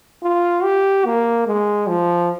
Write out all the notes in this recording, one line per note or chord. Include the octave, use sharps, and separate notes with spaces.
F4
G4
A#3
G#3
F3